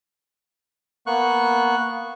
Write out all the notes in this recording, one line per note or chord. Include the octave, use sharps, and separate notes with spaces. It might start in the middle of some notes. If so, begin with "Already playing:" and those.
A#3 B3 C#6 F#6